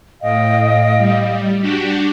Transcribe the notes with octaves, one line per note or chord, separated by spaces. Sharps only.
A2 D#5 F5 G5
G3
D4 F#4 G4